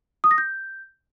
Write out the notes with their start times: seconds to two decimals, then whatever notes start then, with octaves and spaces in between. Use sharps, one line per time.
0.24 D#6
0.31 A#6
0.38 G6